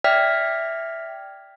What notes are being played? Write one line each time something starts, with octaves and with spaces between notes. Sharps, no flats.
D5 E5 G5 F6 G#6 B6